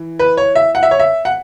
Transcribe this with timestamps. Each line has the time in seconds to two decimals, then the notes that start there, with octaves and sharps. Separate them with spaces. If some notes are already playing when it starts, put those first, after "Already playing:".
Already playing: E3
0.19 B4
0.37 C#5
0.55 E5
0.75 F#5
0.83 E5
0.91 C#5
1.00 E5
1.25 F#5